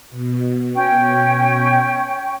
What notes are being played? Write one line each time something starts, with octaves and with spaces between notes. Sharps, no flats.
B2
C#4 G5 C#6